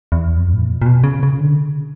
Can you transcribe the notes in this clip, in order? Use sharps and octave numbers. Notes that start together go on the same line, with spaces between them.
E2
F2
A2
A#2
A#2
B2
C#3
C#3
D3